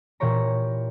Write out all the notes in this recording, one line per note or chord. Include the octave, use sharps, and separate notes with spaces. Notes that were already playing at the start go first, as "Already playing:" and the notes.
A#2 E3 G4 C#5 A#5